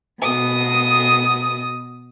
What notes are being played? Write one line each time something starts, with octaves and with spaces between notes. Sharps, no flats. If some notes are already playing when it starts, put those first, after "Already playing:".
B2 D#6